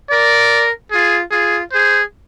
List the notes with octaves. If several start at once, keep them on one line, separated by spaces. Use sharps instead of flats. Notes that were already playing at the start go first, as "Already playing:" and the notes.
A#4 D5
F4 G#4
F4 G#4
G#4 C5